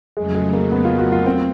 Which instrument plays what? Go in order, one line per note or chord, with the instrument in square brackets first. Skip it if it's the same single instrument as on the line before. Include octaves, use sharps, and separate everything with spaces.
[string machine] F2 C#3 F#3 A3 [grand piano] G#3
[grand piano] G#3
A#3
B3
F4
F#4
F4
C4